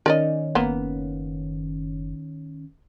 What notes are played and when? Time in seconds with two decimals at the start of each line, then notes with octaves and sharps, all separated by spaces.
0.06 D#3 C#4 A#4 D5 D#5
0.55 F#1 A#3 B3